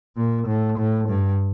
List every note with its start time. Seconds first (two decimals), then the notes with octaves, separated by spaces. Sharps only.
0.17 A#2
0.47 A2
0.79 A2
1.09 G2